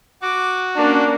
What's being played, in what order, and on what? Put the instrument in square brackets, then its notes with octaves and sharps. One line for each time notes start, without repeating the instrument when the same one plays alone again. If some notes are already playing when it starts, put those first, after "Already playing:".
[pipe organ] F#4 [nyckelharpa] D6
[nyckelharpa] A#3 C#4 [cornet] D4